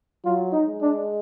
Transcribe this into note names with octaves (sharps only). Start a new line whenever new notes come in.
F#3 F4
D#4
G#3
D4